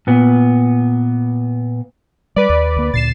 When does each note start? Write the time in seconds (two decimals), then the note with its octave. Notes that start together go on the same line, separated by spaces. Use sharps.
0.07 A#2 B3
2.36 G3 B4 D5
2.49 D#2
2.76 D2 A#3
2.93 D2 A#2 A6 C7 E7